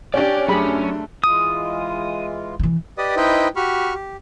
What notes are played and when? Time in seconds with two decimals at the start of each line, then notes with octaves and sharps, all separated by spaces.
0.14 C#4 D4 G4 D5
0.49 F#2 A3 C#4 D4 G4 G#4 B5
1.24 E3 G#3 F4 D#6
2.59 D#3 E3
2.98 G4 B4 D5 D#5 D#6
3.17 D#4 E4 B4 C5 D#5 G5
3.56 F#4 G4 B5 C#6 F6
3.94 G4